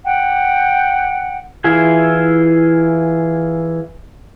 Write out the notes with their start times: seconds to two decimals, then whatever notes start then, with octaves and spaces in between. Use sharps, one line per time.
0.05 F#5 G5
1.64 E3 E4 F4 G#4